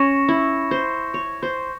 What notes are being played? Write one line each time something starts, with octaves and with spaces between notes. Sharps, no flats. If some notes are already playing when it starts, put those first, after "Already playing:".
Already playing: C#4 C#6 A#6 C#7 E7
E4
C5
C#5
C5